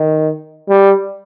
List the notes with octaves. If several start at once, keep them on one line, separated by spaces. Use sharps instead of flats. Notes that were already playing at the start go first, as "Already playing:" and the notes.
Already playing: D#3
G3